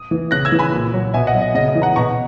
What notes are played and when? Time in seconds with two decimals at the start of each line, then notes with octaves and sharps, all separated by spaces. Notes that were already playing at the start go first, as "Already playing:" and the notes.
Already playing: D#6
0.11 E3
0.31 C#3 F#6 A#6
0.45 E6 G#6
0.52 E3
0.59 G#5 B5
0.72 A#2
0.93 F#3
1.14 B2 E5 G#5
1.27 D#5 F#5
1.34 F#3
1.42 D#5
1.55 C#3 D#5
1.68 D#5
1.75 E3
1.82 F#5 A#5
1.96 B2 A#5 C#6